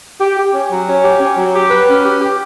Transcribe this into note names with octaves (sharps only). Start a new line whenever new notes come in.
G4
G4
C#4
F#3
C#4
G4
C#4
F#3
G4
B4
C#4
G4
G4